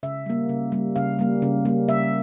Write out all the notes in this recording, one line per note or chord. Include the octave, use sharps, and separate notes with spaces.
C#3 E5
G3 A#3
C#3
G3 A#3
C#3 F5
G3 A#3
C#3
G3 A#3
C#3 E5